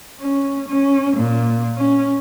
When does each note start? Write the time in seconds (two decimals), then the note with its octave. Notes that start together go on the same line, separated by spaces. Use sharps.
0.20 C#4
0.69 C#4
1.17 A#2
1.76 C#4